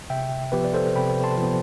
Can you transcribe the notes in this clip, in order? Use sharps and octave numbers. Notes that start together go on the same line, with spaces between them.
C3 E5 G5
F3 B3 G4 B4
D5
A4 C5
C3 G5 B5
A5 C6
F3 B3